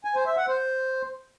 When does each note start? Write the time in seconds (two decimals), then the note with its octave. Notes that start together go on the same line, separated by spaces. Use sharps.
0.05 G#5
0.16 C5
0.26 E5
0.37 F#5
0.48 C5